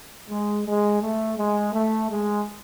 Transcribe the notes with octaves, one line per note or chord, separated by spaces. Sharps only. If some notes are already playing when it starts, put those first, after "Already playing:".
G#3
G#3
A3
G#3
A3
G#3